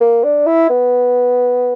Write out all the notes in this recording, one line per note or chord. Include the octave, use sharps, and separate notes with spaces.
A#3
D4
E4
B3